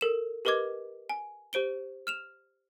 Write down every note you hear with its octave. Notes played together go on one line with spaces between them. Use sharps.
A4 A#4 E7
G4 A#4 B4 D#5 D6 G#6
G#5
G4 C5 D7 G7
F6 E7 F7